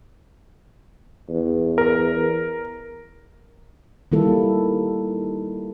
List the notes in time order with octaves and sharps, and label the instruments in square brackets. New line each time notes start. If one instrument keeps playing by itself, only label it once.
[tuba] E2
[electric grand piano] A#4
[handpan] D#3 G3 A#3 E4 A4